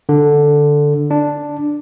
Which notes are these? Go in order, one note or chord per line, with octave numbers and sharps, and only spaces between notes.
D3
D4